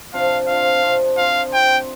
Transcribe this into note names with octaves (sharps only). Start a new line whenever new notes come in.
C3 F3 D4 F5
C3 F3 D4 F5
C3 F3 D4
F3 C4 F4 F5
F3 C4 F4 G5